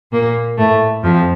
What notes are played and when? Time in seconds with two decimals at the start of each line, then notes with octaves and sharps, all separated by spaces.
0.12 A#2 A#3
0.57 A2 A3
1.03 F2 F3